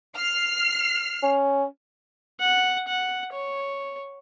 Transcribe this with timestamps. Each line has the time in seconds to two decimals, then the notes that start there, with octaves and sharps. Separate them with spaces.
0.16 F6 C7
1.23 C#4
2.40 F#5
2.88 F#5
3.32 C#5